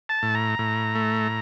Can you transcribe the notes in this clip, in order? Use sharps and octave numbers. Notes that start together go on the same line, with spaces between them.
A5
A2
A#5
A2
A3